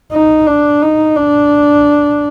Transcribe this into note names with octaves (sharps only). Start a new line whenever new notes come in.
D#4
D4
D#4
D4